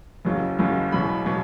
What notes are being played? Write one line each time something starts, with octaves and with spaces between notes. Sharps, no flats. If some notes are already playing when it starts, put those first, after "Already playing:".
F#1 E2 C#3 F#3
F#1 E2 C#3 F#3
E1 E2 B2 F#3 B5
B2 F#3